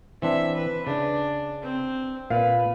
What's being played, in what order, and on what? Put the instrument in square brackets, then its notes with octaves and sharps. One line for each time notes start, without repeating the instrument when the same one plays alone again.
[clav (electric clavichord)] E3 C4 D4 [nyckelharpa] E5
[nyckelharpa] B4
[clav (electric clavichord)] C#3 [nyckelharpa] D4
[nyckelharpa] C4
[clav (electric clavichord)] A#2 [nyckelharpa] B4 [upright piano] F5